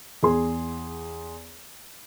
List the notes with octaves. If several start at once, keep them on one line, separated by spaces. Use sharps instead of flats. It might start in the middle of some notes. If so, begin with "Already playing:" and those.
E2 G#4 C6